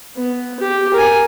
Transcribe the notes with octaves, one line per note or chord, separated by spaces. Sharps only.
B3
G4
A#4 G#5